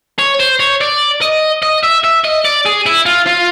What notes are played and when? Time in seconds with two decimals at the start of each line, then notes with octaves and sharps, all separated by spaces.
0.19 C#5
0.40 C5
0.60 C#5
0.81 D5
1.22 D#5
1.63 D#5
1.83 E5
2.04 E5
2.24 D#5
2.45 D5
2.65 G#4
2.86 E4
3.06 F4
3.27 F4